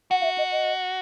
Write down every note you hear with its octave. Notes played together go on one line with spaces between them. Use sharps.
F#4 F#5
F5
E5
D#5
D#5